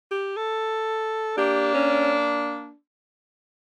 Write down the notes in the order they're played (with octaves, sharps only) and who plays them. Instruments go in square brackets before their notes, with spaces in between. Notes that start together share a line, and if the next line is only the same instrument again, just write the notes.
[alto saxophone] G4
A4
[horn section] A#3 D4 [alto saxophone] G4
[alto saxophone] C#4